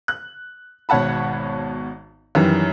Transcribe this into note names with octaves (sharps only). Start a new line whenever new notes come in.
F#6
G#1 B2 C#5 F#5 A5 B5
F#2 D#3 E3 G3